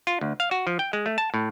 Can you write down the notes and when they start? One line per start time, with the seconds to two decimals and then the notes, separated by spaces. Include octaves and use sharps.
0.07 F4
0.21 D2
0.40 F5
0.51 F#4
0.67 F3
0.79 G5
0.93 G#3
1.06 A3
1.18 A5
1.34 A2